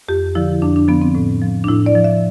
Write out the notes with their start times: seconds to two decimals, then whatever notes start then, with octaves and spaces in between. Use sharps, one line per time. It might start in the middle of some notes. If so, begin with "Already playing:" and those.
0.08 F2 G4
0.35 D3 F3 E4
0.62 F2 D4
0.76 D4
0.88 D3 F3 B3
1.01 C4
1.15 A2
1.42 F3
1.64 D4
1.68 A2 E4
1.86 D5
1.95 F3
2.04 E5